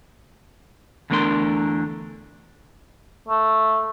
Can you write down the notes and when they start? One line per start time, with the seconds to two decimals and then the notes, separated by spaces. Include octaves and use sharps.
1.10 E2 D3 A3 D4 A#4 C6
3.28 A3